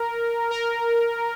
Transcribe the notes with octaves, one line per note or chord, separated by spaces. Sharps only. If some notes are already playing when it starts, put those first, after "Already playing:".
Already playing: A#4
A#4